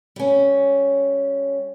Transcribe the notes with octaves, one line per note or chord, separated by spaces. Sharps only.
G3 C#4